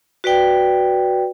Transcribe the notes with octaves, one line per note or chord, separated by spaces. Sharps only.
F#4 B4 D5 G5